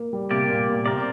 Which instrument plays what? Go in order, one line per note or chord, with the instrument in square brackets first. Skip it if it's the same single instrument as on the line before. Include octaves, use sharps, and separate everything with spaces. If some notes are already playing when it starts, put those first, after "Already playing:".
Already playing: [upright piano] A#3
G3
[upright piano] C3 [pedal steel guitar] A#3 G4 D5
[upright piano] A#2
A#2
[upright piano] C3 [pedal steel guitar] C4 A#4 D5